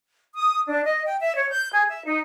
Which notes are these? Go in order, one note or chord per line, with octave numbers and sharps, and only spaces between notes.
D#6
D4
D#5
G5
E5
C#5
G6
G#4
E5
D#4